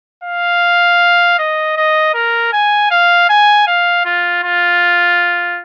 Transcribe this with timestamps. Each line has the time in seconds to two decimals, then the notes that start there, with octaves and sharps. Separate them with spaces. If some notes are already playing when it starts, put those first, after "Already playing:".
0.23 F5
1.38 D#5
1.77 D#5
2.14 A#4
2.53 G#5
2.91 F5
3.29 G#5
3.67 F5
4.05 F4
4.43 F4